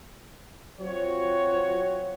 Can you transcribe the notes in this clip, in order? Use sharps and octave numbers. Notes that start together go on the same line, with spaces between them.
F#3 C4 F4 F#4 C#5